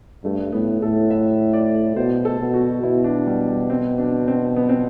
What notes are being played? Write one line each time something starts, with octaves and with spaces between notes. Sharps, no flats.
G2 A3
A2 B3
A2 A4
E5
D5
B2 C5
A4
B2
F#4
B2 E4
D4
G3
G3
C4
D4
C4
B3
C4